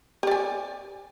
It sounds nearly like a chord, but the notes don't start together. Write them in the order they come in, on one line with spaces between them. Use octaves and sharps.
G4 D5 G#5